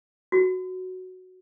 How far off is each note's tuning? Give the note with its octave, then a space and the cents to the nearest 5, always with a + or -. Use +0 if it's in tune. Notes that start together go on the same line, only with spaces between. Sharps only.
F#4 +0